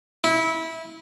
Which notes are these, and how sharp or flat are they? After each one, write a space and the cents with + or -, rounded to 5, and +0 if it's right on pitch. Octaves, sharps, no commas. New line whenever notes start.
E4 -20